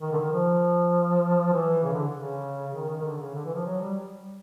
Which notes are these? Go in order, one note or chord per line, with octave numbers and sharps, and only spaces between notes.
D#3
D3
D#3
F3
E3
C#3
D3
C#3
D#3
D#3
D#3
D3
C#3
D3
E3
F3
F#3
G3